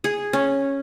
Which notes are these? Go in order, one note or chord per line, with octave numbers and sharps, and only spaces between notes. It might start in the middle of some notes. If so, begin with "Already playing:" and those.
G#4
C#4